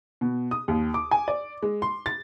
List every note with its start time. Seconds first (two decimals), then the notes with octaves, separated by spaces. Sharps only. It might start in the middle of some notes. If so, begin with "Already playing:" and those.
0.21 B2
0.51 D#6
0.68 D#2
0.94 D6
1.11 G#5
1.28 D5
1.62 G#3
1.82 C6
2.06 A6